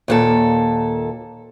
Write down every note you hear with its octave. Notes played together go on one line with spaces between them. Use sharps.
D#2 A#2 A4